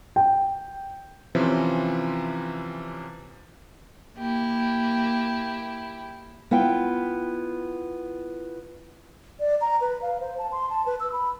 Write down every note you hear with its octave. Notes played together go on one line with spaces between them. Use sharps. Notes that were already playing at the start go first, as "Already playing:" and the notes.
G5
C3 E3 F3 C4 C#4
A#3 E4 G4
B3 E4 F4 G5
D5
A#5
B4
F5
C5
A5
C6
A5
B4
E6
B5